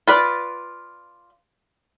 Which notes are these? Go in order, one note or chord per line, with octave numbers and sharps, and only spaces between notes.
F4 B4 D5